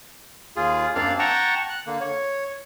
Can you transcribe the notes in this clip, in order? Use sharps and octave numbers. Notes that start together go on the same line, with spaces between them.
D#2 F4 G#4
F#2 A#3 C4 D4 D5 F5
F#5 G5 A5 A#5 C#6
F#6
D3 A#3
C#5